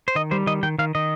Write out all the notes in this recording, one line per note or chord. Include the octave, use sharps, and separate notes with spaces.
C5
D#3 D#5
G3 C5
D#3 D#5
D#3 G5
D#3 F5
D#3 D#5